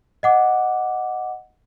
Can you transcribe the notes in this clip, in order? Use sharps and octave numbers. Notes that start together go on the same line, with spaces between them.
D#5 F#5 D6